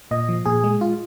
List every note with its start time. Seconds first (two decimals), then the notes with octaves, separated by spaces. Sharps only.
0.11 A#2 D#5
0.29 F3
0.46 A#2 G#4
0.64 G#3
0.81 F4